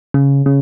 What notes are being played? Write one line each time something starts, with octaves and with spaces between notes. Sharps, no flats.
C#3
C#3